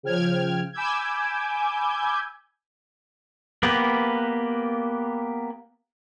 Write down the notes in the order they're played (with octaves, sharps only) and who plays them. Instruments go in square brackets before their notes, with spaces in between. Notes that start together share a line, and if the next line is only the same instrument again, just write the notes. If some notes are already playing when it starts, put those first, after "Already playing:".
[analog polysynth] C#3 F3 G5 F6 G#6
G#5 B5 D6 E6 G6 G#6
[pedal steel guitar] A#3 B3 G4 B4